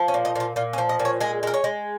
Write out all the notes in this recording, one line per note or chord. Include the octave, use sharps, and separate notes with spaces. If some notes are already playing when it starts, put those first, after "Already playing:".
Already playing: F3
C#4
A#2
D#4
A#2 F4
A#2 F4
C#4
F3
D#5
A#2
C#5
G#3 G#4
G#3 A#4
C#5
G#3